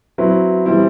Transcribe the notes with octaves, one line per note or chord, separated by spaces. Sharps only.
F#3 C4 E4 B4
E3 G3 C4 E4